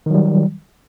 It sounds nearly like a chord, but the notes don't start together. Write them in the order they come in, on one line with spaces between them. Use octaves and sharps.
D#3 F#3 G3